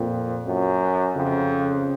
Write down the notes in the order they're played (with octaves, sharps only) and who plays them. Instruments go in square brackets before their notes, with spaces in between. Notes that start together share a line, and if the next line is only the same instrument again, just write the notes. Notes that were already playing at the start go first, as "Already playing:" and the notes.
Already playing: [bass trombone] F2 [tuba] A#2
[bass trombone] F#2
[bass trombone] F2 [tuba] C#3